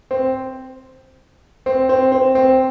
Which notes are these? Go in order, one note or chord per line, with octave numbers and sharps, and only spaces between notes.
C4
C4
C4
C4
C4